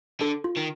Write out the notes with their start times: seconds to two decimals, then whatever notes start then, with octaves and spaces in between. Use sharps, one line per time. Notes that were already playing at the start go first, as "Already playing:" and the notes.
0.20 D3 A4
0.44 F4
0.56 D#3